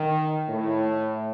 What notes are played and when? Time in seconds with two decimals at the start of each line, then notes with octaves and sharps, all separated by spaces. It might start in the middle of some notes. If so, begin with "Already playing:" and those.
Already playing: D#3
0.49 A2